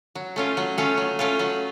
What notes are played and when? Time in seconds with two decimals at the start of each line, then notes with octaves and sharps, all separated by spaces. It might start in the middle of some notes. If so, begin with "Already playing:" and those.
0.15 F#3
0.36 A3 C#4 F4
0.57 F#3
0.78 A3 C#4 F4
0.97 F#3
1.19 A3 C#4 F4
1.39 F#3